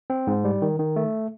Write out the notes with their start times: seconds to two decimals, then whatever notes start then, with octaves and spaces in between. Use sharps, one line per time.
0.10 C4
0.27 G#2
0.44 G3
0.62 D#3
0.79 D#3
0.96 A3